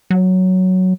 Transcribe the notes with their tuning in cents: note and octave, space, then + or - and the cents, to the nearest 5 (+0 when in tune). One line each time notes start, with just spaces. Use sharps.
F#3 +5